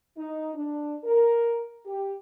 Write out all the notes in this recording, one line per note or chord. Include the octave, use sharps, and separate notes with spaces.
D#4
D4
A#4
G4